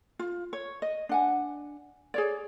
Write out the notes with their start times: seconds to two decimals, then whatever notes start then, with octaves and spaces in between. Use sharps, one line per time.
0.19 F4
0.53 C#5
0.82 D#5
1.09 D4 F#5 G#5
2.14 G#4 C#5 D5